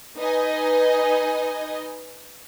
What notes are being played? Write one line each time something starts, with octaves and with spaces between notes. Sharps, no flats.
D#4 B4 D#5 G#5